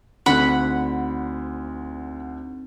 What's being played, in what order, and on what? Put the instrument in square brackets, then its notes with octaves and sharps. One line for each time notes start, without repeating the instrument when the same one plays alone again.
[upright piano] D2 D3 [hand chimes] C4 D#4 [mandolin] F#5 B5